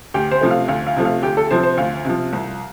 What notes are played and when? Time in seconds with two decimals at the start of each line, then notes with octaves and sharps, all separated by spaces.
0.14 D2 G4
0.31 C5
0.41 C3 F3 A3
0.51 F5
0.68 D2 F5
0.87 F5
0.96 C3 F3 A3
1.05 F5
1.23 D2 G4
1.37 A4
1.51 C3 F3 C5
1.63 C5
1.77 D2 F5
2.05 C3 F3
2.33 C2